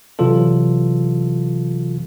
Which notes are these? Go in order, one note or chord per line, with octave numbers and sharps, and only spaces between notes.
C3 E3 F#3 F4 A4